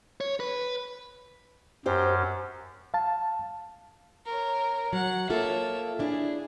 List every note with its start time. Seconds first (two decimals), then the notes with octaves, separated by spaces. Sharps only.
0.21 C#5
0.40 B4
1.86 F#2 G4 C5
2.94 F5 A5
4.26 A#4 C#5
4.93 F#3 F#5
5.30 A#3 F4 A4 C#5 E5
5.99 D4 E4 G#4